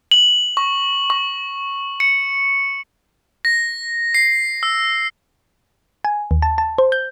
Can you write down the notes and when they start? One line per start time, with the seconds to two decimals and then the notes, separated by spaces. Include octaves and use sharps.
0.11 F#7
0.57 C#6
1.10 C#6
2.00 C#7
3.45 A#6
4.14 C7
4.63 E6
6.05 G#5
6.31 D#2
6.42 A5
6.58 A5
6.78 C5
6.92 G6